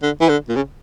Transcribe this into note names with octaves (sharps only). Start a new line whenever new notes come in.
D3
E3
D3
A#2
C#3